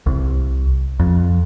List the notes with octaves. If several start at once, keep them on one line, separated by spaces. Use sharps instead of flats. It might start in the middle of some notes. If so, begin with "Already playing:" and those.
C2
F2